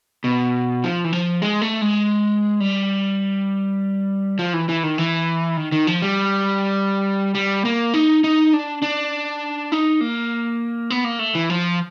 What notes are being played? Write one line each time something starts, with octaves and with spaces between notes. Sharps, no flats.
B2
F3
E3
F3
G#3
A3
G#3
G3
F3
E3
E3
D#3
E3
D#3
D#3
F3
G3
G3
A#3
D#4
D#4
D4
D4
D#4
A#3
B3
A#3
A3
E3
F3